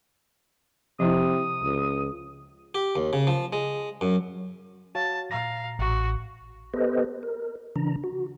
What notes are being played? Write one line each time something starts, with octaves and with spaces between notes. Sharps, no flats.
C3 F3 E4 D#6
C#2
G4
D#2
C#3
F3
G#3
F#2
F#4 C#5 F5 A5
A#2 F5 A#5 A#6
A1 F#4
B3 G4 A4 B4 C5 D#5
A#4
C#3 E3 D4 A#5
F#4